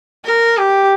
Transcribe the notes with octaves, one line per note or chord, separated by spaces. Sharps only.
A#4
G4